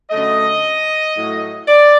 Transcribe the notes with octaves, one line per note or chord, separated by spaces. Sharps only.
F#2 D3 F#3 A3 D#5
A2 F#3 A3
D5